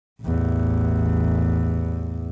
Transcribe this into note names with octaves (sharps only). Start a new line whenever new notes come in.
A1 E2